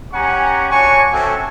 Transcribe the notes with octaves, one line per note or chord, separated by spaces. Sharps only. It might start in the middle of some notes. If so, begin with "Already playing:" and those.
C#4 G4 F#5 G#5 A#5 C#6
D4 F#4 C#5 G#5 C#6
C4 C#4 F#4 A4 E5 G#5